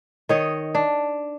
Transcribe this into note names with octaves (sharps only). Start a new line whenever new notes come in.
D#3 C#5 D#5
D4